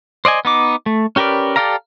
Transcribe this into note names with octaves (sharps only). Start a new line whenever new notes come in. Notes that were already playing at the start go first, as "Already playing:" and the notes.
C5 D5 D#5 G#5
B3 D#4 D6
A3
C#4 G4 A#4 B4 D5
G4 A4 D5 F5 A#5